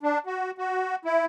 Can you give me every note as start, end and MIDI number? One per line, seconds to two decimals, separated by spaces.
0.03 0.19 62
0.26 0.51 66
0.58 0.96 66
1.05 1.25 64